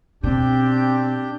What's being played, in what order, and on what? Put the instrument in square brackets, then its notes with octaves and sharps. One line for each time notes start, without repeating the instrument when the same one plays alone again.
[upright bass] B2 [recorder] C4 [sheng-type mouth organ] D4 G4 G6